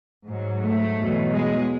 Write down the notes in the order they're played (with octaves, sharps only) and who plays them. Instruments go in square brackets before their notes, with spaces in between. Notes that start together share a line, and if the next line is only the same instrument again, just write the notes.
[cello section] G#2 F#3
A3
E2 B2 F#3
G#3